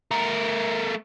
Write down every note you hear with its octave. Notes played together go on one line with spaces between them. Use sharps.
A3 A#4